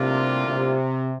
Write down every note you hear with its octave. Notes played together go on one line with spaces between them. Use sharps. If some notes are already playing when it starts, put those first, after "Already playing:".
Already playing: A2 C3 G3 A#3 D4 F4
C3